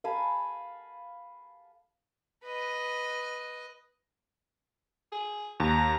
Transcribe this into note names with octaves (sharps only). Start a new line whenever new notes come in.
F5 G#5 A5 B5
B4 D#5
G#4
D#2 A#5